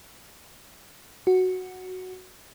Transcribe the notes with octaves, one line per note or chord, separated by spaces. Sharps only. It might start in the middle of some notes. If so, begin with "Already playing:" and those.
F#4